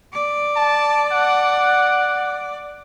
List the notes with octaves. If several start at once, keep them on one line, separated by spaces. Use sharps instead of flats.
D5
A5
F#5